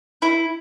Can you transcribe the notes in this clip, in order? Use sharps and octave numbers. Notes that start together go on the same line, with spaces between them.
E4